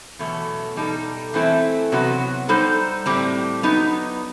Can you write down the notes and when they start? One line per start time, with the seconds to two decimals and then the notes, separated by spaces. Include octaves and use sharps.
0.19 E2 B2 F#3 A3
0.77 B2 G3 D#4 A4
1.34 E3 A3 C4 E4 A4
1.92 C3 F#3 B3 F#4
2.49 G3 D#4 A4 C5
3.06 A2 G3 C4
3.63 F#3 B3 D#4